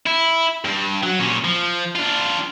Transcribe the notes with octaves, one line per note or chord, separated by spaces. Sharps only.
E4
G2
F#3
A#2 C#4
F3
D4 F4